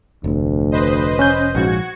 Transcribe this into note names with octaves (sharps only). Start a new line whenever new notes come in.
F1 D2
B4 C5 D#5
C#4 G6
A#1 G#2 F#4 G#6 C#7